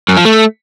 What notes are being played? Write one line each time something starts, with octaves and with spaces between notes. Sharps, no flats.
F#2
F3
A3